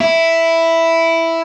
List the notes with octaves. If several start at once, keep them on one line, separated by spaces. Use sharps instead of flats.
E4